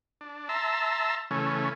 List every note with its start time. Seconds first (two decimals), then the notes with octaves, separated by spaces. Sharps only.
0.21 D4
0.49 E5 A5 A#5 C6 E6
1.31 C#3 E3 A3 C#4